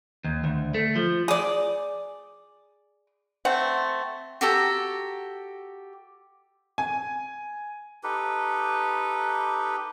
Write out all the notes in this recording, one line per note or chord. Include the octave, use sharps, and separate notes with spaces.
D#2
D2
A3
F3
G#4 D5
A3 C4 F#5
F#4 G4 A4 A#5
G#5
D#4 G4 A4 B4